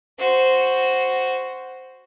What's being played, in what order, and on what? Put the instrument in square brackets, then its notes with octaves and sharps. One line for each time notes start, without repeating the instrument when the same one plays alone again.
[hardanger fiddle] F#4 C5